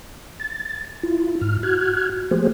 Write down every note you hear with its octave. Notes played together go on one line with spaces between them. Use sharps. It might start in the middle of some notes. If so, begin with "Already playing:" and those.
A6
E4 F4
G#2 F6
F#4 F6 F#6 G#6
F3 A3 A#3 G4 G#4 C5